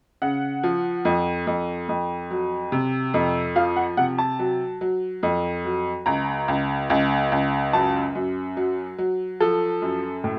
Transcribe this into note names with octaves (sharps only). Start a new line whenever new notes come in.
C#3 F#5
F3
F2
F2
F2
F#3
C3
F2
F3 F5
F#5
C3 F#5
A5
F#3
F#3
F2
F#3
C#2 A#5
C#2
C#2
C#2
F#2 A5
F#2
F#3
F#3
F3 A4
F#2
A2